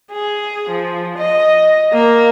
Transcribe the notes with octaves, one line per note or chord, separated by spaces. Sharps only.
G#4
F3
D#5
A#3